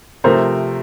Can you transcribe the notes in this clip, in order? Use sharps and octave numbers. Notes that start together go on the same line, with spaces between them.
C3 F3 A3 A#4 C5